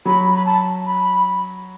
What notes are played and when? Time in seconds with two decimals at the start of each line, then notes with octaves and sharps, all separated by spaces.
0.06 F#3 B5
0.34 B5
0.46 A5
0.86 B5